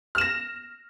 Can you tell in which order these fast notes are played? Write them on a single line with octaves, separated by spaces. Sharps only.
F6 E7 A#6